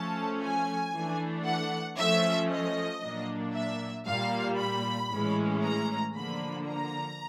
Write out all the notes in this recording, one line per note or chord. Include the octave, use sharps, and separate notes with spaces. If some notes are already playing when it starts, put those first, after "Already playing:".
Already playing: F3 A3 C#4 A5
G#5
E3 A3 D4
F#5
F3 A3 C#4 E5
D#5
A#2 F#3 A#3 D4
E5
A#2 G3 A#3 F5
B5
A2 E3 G#3 C#4
A#5
D3 F3 A#3 B5
A#5